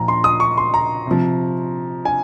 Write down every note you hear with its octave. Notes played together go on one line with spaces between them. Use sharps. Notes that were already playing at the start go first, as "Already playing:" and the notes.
Already playing: A#2 F3 A#5
C6
D#6
C#6
C6
A#5
C3 F3
G#5